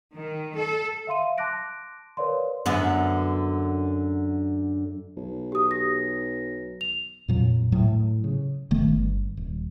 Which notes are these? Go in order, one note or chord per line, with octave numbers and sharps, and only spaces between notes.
D#3
A4
E5 F5 C6 D#7
A5 C6 D6 F#6 A#6 D7
A#4 B4 C#5 D5 F5 C6
F#2 D3 B3
B1
G4 D#6
A#6
F7
F2 A#2 F#3
A2 F#3 A3
C#3
F#1 D#3 A3 B3
G1
D#1